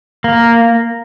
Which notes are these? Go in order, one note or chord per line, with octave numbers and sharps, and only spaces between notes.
A#3